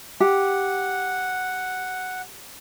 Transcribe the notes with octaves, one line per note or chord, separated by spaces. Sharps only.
G4 F#5